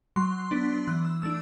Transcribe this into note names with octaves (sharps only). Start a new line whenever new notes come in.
F#3 C6
B3 D4
E3 F#6
E6
A3 D4 E6